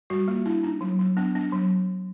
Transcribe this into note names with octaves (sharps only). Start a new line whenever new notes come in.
G3 F#4
A#3 F4
D4 E4
D4 D#4
F#3
F#3
B3 D4
D4
F#3